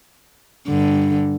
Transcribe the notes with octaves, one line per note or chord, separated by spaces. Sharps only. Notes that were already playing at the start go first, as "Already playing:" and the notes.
G2 D3